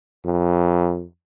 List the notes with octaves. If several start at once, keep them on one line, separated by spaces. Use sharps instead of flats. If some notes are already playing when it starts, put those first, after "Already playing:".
F2